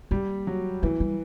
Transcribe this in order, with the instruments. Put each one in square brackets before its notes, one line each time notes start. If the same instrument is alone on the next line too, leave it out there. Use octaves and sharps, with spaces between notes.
[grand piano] G3 [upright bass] A#3
[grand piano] F#3
[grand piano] E3 [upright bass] A3
[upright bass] G3